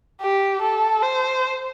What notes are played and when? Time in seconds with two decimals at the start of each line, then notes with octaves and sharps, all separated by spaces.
0.21 G4
0.62 A4
1.03 C5